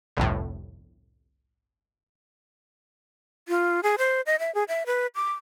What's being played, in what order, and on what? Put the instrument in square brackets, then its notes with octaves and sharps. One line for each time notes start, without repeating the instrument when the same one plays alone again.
[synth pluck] G1 C2 F2 A2
[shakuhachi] F4
G#4
C5
D#5
E5
G#4
E5
B4
D6